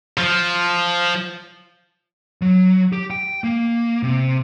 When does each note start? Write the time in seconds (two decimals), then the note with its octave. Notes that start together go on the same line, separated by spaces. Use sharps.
0.18 F3
2.42 F#3
2.93 G4
3.10 G5
3.44 A#3
4.03 C3